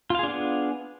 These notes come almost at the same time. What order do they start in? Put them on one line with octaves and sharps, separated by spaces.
F4 F5 G#4 D4 B3